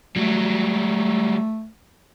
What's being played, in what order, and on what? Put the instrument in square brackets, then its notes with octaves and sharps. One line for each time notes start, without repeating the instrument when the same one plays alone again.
[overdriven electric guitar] F#3 G3 [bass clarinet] A3